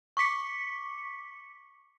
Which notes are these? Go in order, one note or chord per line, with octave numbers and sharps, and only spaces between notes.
C#6 D6 B6 C#7